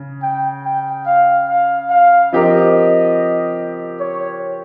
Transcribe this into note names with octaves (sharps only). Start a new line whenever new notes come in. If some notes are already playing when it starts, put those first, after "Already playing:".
Already playing: C#3
G5
G5
F5
F5
F5
F3 C4 G4 A#4 D#5
C#5